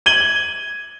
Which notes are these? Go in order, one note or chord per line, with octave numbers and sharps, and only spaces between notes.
G#6 D#7 F#7 G7